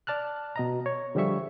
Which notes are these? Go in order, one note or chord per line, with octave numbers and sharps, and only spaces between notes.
D5 A5 F6 F#6
B2 D#5 A#5
C#5
D3 F3 G3 G#4 E5 C#6